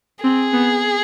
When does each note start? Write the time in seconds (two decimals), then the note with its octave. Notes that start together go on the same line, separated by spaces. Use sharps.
0.24 C4 G#4
0.53 B3